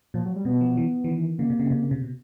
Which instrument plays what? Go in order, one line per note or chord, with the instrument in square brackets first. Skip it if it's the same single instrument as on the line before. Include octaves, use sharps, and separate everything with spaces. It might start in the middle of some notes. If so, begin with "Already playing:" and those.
[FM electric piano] A#2 [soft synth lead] F3
[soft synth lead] F#3
G3
[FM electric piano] B2 [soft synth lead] B3
[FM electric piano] F3
E3
E3
D#3
[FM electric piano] C#3 [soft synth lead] A#3
[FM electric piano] C3
C#3
C3
C3
B2